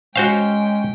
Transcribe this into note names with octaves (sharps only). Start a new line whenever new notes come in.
G#3 C#4 F#4 C5 F5 G5